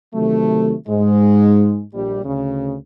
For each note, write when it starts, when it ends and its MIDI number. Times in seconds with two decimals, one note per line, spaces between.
0.14 0.74 38
0.14 0.74 48
0.14 0.74 51
0.14 0.74 54
0.14 0.74 57
0.88 1.83 44
0.88 1.83 56
1.94 2.23 34
1.94 2.23 55
2.24 2.75 38
2.24 2.75 49